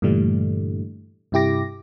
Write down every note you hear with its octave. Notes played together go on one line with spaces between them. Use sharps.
G2 A#2 D3 E3 G3 A3
G2 C3 E4 G4 D6 A#6